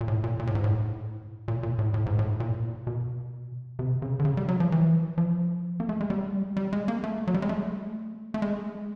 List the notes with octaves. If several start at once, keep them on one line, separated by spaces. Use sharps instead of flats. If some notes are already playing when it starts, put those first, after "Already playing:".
A#2
A2
A#2
A#2
A2
G#2
A2
A#2
A#2
A2
A2
G#2
A2
A#2
B2
C3
C#3
D3
C#3
G3
F#3
F3
E3
F3
A#3
A3
G#3
G3
G3
G#3
A#3
A3
F#3
G3
G#3
A3
A3
G#3